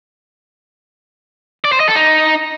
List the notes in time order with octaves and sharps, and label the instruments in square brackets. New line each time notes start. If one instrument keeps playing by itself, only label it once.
[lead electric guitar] D5
C5
D#5
A4
D#4